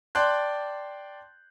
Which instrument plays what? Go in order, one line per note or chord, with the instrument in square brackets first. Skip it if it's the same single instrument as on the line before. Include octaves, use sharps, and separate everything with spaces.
[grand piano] D5 G5 A5 C6 F#6 G6